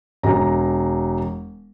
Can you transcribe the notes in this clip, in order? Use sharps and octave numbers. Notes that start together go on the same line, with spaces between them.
E1 A#5